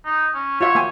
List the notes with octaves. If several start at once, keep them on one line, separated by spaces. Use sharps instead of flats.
D#4
C#4
F4 F#4 C#5 E5
A#3 G5 G#5